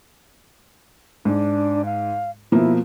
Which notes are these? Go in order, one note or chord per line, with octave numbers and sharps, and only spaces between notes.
G#2 D4
F5
B2 F3 A#3 E4